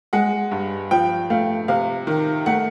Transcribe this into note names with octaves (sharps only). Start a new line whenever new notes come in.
G#3 F#5
G2
F3 G5
A3 F5
C3 F5
D#3
A3 F#5